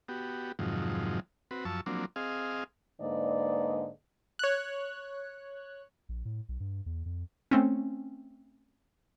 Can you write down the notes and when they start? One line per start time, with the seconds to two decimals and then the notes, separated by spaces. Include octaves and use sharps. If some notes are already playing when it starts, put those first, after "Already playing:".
0.09 B3 F#4 G4
0.59 F2 G#2 C3 D#3 F3 F#3
1.51 C4 F#4 B4
1.65 F#2 F3 A5 C#6 E6
1.86 F3 F#3 A#3 C4 D4
2.16 C4 G#4 D#5 F5
3.00 G#2 D3 A#3 B4 D5 D#5
4.39 C#5 F#6
6.09 A#1
6.25 A2
6.49 B1
6.60 G2
6.86 E2
7.05 F2
7.51 A3 C4 C#4